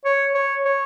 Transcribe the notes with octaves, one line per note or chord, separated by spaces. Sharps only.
C#5
C#5
C#5